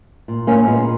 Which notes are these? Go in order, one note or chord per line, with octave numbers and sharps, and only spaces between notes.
A#2
A#3 C#4
A#2 G#3 B3